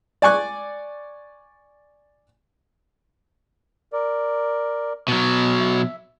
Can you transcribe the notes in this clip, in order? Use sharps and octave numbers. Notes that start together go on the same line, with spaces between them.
D5 G#5 C#6 F#6
A#4 D5
B2 F#3
E5